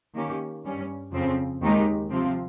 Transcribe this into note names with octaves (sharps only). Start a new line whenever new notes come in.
D#3 A#3 C#4 G4
G2 G3 C#4
F2 C#3 F3 C4
D#2 D#3 G#3 D#4 G4
C3 F3 C4 F4